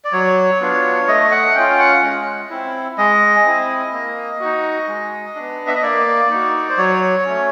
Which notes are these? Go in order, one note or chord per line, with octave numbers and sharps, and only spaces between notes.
D5
F#3 C#5
B3 D4 F4
A3 D#5
F#5
C#4 F4 G5
F#5
G#3
C4 E4
G#3 D#5
C4 E4
A#3
D#4 F#4
G#3
B3 D4
E5
D#5
A#3 D5
D#4 F#4
C5
F#3 C#5
A3 C#4